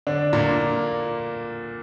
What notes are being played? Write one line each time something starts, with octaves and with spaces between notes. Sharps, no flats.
D3 D4
A#2 A#3